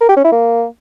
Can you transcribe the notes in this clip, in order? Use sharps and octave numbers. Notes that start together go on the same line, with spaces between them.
A#4
G4
C#4
E4
A#3